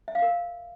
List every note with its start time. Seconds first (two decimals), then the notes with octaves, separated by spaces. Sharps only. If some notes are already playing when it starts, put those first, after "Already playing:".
0.08 E5
0.15 F5
0.22 A#4